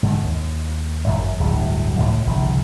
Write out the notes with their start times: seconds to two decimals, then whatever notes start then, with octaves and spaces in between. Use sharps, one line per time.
0.03 G#2 D3 D#3
0.24 D#2
1.07 G#1 F#2 C#3 F#3
1.40 D1 G1 D2 F#3
1.98 C#2 A2 D#3 E3
2.27 G1 C2 C#3 F3